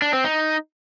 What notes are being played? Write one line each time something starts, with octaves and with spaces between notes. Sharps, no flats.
D4
C4
D#4